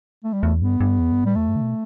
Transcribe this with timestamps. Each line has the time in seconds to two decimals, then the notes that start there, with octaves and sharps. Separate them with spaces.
0.24 A3
0.33 G3
0.43 E2 A3
0.61 G2 B3
0.80 G2
0.99 E2
1.12 G2
1.24 A2 G3
1.36 E2 A3
1.49 G2
1.56 D3
1.61 B2